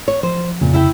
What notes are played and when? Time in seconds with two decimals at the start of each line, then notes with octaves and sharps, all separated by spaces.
0.08 C#5
0.23 F3 C5
0.61 F2 A#2 C#3
0.73 E4 E5 G5